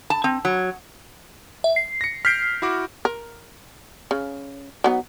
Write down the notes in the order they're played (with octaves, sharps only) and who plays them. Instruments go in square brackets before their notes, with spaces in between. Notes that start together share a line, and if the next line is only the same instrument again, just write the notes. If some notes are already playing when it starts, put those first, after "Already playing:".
[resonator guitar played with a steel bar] A5
C4
F#3
[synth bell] E5
C7
[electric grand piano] A#6 C#7
[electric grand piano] F6 G6 D7 [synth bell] B6 C7
[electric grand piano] E4 F#4 D6
[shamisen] A#4
C#3
F#3 B3 D#4